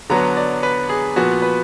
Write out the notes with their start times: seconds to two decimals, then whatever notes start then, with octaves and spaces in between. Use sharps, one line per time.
0.10 D3 F#3 B3 A#5
0.37 D5
0.63 B4
0.89 G#4
1.16 A#2 F3 B3 F#4
1.42 B4